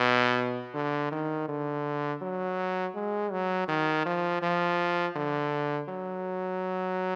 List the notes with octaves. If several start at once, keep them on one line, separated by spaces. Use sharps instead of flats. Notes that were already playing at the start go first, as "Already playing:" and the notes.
Already playing: B2
D3
D#3
D3
F#3
G#3
F#3
D#3
F3
F3
D3
F#3